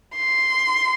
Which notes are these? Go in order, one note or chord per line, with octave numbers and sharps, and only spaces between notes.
C6